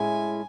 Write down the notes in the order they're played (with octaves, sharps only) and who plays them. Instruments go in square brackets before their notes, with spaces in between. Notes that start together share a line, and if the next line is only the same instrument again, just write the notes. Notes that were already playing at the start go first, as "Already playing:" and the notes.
Already playing: [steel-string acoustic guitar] A2 G#3 C#4 E4 [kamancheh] G#5